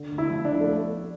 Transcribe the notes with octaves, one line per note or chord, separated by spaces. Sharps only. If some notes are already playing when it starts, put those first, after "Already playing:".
Already playing: D3
D2
E4
F3
D4
D3
A3